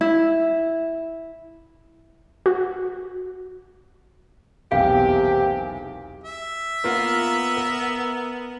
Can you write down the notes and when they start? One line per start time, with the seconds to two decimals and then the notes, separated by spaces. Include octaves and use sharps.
0.01 E4
2.46 F#4
4.72 B1 E2 C3 A#3 G4 F5
6.24 E5
6.84 A#3 B3 F4 A#4
7.57 A#4